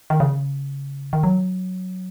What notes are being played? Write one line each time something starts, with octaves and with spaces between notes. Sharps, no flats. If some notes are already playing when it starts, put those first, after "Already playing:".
D#3
C#3
D#3
F#3